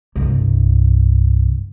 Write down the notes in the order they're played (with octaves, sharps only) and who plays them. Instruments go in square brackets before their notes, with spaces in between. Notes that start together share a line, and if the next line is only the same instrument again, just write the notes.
[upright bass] C2 G2